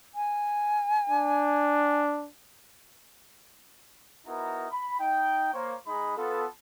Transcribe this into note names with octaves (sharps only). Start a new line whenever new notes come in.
G#5
D4
B3 D#4 E4 F#4 A#4 A#5
B5
D#4 G5
A#3 C5 C#5
G#3 D#4 B5
B3 F4 A4